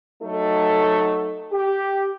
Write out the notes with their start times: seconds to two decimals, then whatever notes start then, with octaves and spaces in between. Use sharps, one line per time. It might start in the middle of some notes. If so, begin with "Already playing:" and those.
0.23 F#3 A3 D#4 A4
1.53 G4